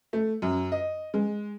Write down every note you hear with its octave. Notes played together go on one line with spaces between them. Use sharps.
A3
F#2
D#5
G#3